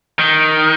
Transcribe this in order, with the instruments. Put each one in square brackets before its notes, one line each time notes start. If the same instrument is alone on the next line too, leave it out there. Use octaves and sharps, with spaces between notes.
[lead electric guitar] D#3